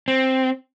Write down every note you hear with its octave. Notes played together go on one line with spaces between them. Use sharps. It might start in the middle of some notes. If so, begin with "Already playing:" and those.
C4